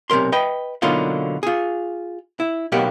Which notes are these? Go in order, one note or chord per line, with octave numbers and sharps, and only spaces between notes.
B1 C3 F3 A#4 C6
B4 D#5 G5
B2 D3 F#3 A#3 D#4 F4
F4 G#4
E4
B1 B2 A#3 G4 F#5